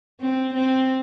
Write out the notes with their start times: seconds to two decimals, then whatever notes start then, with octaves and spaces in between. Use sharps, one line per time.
0.20 C4
0.54 C4